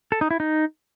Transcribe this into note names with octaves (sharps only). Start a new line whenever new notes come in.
A4
D#4
E4
D#4